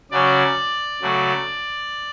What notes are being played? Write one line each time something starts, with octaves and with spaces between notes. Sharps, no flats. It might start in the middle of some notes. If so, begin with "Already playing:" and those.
C#3 F#3 C#4 D5
C#3 F#3 A3